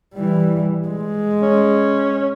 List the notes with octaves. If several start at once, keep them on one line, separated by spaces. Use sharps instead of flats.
E3 G3
G#3
C#4